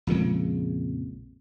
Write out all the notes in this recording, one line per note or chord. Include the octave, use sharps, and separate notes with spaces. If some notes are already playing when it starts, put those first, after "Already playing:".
A#1 F2 C#3 G#3